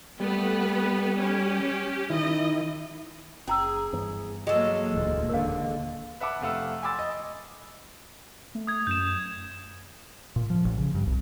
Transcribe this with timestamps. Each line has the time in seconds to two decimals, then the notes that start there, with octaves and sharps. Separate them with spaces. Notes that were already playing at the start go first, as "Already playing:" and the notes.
0.20 G3 A3 B3 B4
1.17 C#4 G4
2.10 D#3 E4 D#5
3.47 F#1 C#4 G#4 A#5 E6
3.93 G2 E3 B3
4.47 F#3 G#3 A#3 G#4 A4
4.93 E1 D2 A#2 E3
5.29 D#2 D3 A#4 F5
6.20 B4 E5 F#5 A5 D6
6.41 F1 C3 A3 F5 F#5 E6
6.83 G#5 B5 C6 D6 E6 A6
6.99 D#5
8.55 A3
8.67 D#6 G#6
8.87 F#2 G6 E7
10.36 A#2
10.50 F3
10.65 A1
10.78 C#3
10.95 G2
11.07 C2